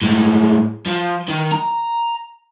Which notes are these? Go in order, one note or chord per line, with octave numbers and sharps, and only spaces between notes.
A2 G#3
F3
D#3
A#5